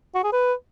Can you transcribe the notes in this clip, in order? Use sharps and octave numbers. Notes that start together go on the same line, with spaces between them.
F#4
G#4
B4